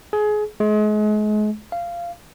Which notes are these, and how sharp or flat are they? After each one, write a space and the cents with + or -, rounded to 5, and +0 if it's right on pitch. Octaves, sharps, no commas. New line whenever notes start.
G#4 +25
G#3 +35
F5 -15